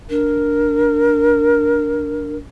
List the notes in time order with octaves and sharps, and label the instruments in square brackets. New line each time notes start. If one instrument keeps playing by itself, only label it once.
[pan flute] D4 [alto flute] A#4